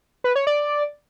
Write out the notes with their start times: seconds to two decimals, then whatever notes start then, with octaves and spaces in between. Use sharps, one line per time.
0.24 B4
0.36 C#5
0.47 D5